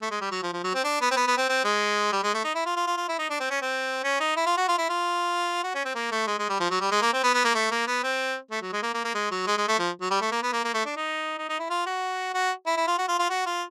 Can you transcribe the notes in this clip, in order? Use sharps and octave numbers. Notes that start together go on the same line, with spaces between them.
A3
G#3
G3
F#3
F3
F3
F#3
C4
D4
B3
C4
B3
B3
C4
C4
G#3
G3
G#3
A3
D#4
E4
F4
F4
F4
F4
E4
D#4
D4
C4
C#4
C4
C#4
D#4
E4
F4
F#4
F4
E4
F4
F#4
C#4
C4
A#3
A3
G#3
G#3
G3
F3
F#3
G3
G#3
A#3
C4
B3
B3
A#3
A3
A#3
B3
C4
A3
F#3
G#3
A#3
A#3
A#3
G#3
F#3
G#3
G#3
A3
F3
F#3
G3
A3
A#3
B3
A#3
A#3
A3
D4
D#4
D#4
D#4
E4
F4
F#4
F#4
E4
E4
F4
F#4
F4
F4
F#4
F4